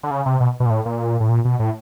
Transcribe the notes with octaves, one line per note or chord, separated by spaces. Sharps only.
D3
C#3
C3
B2
B2
A#2
A2
A#2
A2
A#2
B2
A2